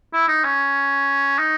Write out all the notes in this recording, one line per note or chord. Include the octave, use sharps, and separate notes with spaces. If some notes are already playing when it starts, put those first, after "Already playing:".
E4
D#4
C#4
D#4